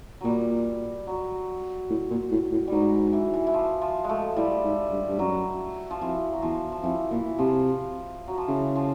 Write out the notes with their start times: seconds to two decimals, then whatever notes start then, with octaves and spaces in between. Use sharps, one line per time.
0.21 A#2 F#3 G3
1.07 F#3
1.90 A2
2.11 A#2
2.31 A2
2.51 A2
2.67 G#2 F#3 G3
3.13 E3
3.34 E3
3.47 E3
3.54 F3
3.81 F3
4.04 G#3 A3
4.37 A2 G3
4.64 G#2
4.91 G2
5.09 G2
5.19 F#2 F#3
5.91 F3
6.01 F2 E3
6.33 F#3
6.42 E2 F3
6.72 F3
6.83 F2 E3
7.11 A#2 E3
7.39 C3 F3
8.28 F#3
8.37 F3
8.48 C#3 E3
8.75 F3